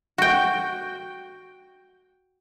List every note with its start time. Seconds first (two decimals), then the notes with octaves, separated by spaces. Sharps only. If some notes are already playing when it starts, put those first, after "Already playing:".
0.18 F#4 G5